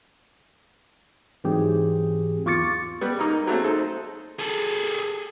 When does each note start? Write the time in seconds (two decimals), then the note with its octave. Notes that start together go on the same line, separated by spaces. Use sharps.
1.44 G#2 E3 F#3 C4 G4 G#4
2.45 E2 F4 C#6 D6 A6 C#7
3.01 G3 B3
3.19 A#3 D#4
3.47 F#3 A3 C4
3.64 D#4 A4 C5
4.39 G#4 A4